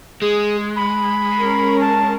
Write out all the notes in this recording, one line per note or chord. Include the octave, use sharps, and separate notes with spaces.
G#3 G#4
B5
C#4 A#4
A5